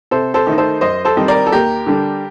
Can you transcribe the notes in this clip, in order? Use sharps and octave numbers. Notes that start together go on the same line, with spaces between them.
C3 A4 C5
A4 C5
D#3 A3 D#4
A4 C5
F#2 C5 D#5
A4 C5
D#3 G3 C4 D#4
A#4 D5
A4
D#2 G4 A#4
D3 G3 D4